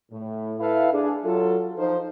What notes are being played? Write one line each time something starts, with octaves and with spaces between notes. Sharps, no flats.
A2
E4 A4 B4 E5 F5
D4 G#4
F#3 F4 A4
F3 D#4 C5